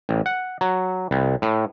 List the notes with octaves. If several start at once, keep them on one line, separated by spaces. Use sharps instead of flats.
A1
F#5
F#3
C2
A2